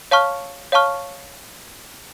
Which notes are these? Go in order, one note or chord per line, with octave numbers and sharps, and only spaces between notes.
C#5 F5 A5 C#6 F6
C#5 F5 A5 C#6 F6